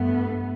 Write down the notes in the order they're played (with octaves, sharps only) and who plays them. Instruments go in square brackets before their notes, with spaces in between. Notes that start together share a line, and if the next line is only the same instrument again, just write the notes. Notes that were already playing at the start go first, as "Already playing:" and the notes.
Already playing: [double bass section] G2 A3 B3